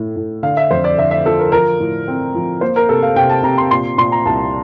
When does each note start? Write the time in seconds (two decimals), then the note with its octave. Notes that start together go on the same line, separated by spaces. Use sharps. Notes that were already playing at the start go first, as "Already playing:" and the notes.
Already playing: A2 A3
0.16 A2
0.43 D3 F5
0.57 E5
0.71 F2 C5
0.84 D5
0.98 D3 E5
1.11 E5
1.25 F3 A4
1.39 A#4
1.52 F3 A#4
1.80 A2
2.08 C4
2.34 F3
2.61 A#3 C5
2.76 A#4
2.89 C3 A4
3.03 F5
3.16 C3 G5
3.29 A5
3.43 C3 A#5
3.58 C6
3.71 A#2 C6
3.98 A#2 C6
4.12 A#5
4.26 C2 A5